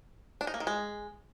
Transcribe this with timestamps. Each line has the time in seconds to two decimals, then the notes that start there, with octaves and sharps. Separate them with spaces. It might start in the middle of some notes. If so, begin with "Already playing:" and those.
0.41 D4
0.47 D#4
0.54 A#3
0.60 D#3
0.67 G#3